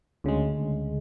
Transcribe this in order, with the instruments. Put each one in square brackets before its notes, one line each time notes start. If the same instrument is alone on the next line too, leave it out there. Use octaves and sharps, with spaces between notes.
[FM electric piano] D2 C#3 G#3